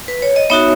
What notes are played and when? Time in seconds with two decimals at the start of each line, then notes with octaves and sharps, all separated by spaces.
0.08 B4
0.22 C#5
0.36 D#5
0.50 B3 D#4 F#4 C#5 E5